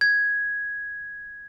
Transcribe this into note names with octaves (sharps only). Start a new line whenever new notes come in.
G#6